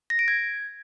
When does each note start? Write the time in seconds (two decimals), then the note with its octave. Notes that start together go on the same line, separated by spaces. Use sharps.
0.10 A#6
0.19 D7
0.28 G#6